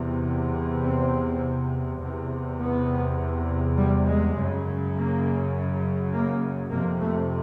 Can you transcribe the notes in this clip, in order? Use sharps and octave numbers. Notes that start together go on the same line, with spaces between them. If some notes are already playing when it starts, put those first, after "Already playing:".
Already playing: E2 C3
C4
E2 C3
B3
G3
G#3
F#2 C#3
A#3
A#3
F2 C3 A#3
A3